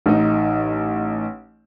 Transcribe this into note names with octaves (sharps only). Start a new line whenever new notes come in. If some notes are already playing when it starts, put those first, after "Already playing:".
A1 D#4